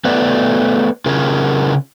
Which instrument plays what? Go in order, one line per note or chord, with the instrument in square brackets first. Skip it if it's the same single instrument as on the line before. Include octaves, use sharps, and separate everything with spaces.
[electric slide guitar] A3 B3 B4 D5
C#3 C#4 F4 G#4 A#4